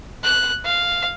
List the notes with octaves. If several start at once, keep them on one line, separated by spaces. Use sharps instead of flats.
F#6
F5